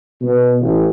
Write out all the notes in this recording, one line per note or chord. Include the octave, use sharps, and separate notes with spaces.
B2
A1